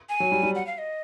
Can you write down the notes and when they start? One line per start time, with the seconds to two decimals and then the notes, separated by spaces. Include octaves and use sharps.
0.09 G#5
0.20 F#3
0.32 G3
0.43 G3
0.55 F#5
0.67 F5
0.78 D#5